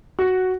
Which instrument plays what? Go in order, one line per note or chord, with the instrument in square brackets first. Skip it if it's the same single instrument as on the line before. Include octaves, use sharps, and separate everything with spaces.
[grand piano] F#4